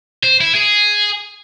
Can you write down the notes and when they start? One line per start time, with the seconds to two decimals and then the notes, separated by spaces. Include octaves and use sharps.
0.24 C5
0.41 E4
0.55 G#4